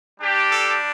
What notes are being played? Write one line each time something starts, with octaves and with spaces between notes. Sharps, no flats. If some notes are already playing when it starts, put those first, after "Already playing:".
G3 D4 G4
A4